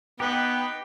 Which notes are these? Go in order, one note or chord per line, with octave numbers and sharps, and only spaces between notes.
B3 D#4 G4 B4 G5